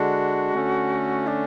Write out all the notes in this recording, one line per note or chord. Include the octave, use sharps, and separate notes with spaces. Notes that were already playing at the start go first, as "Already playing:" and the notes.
Already playing: D3 G#3 D4 F#4
D3 A3 C#4
D4